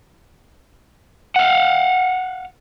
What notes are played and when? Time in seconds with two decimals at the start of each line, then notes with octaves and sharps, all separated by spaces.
1.36 F5 F#5